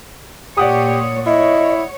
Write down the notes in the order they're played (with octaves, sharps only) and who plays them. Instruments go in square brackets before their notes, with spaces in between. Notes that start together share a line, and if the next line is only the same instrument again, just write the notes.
[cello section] A#2 C#5 [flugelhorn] G4 [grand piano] D5 F#5 D#6
[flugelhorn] E4 [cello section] C#5 [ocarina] D#5